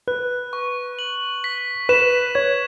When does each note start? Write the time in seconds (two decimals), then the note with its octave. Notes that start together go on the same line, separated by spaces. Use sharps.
0.07 B4 F#6
0.53 C#6
0.99 F#7
1.44 B6
1.89 B4 E7
2.35 C#5 G#6